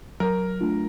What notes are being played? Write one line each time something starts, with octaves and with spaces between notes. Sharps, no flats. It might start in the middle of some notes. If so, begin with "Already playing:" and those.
F#3 A#4
A3 D4 F4